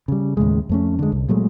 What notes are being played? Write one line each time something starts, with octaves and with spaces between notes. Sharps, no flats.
C#3 G3
D#2 A2 C#3 G#3
F2 A3 C#4
D3 G#3
C2
A#2 F#3 G#3 A3